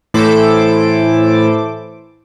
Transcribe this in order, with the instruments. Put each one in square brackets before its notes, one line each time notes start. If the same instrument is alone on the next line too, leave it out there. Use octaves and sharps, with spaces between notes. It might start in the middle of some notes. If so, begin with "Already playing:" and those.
[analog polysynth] A2 E3 E4 A4 C5 D6